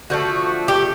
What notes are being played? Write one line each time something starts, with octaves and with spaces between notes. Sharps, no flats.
D3 F3 A3 F#4
G4